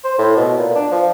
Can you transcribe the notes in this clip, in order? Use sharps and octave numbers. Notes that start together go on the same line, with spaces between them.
C5
A2
B2
A#2
D4
F3